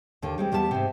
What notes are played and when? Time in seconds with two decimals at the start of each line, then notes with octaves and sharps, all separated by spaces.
0.22 D#2 D3
0.38 G3 G#3 C4
0.52 E2 G3 B3 A4 A5
0.71 G#2 C3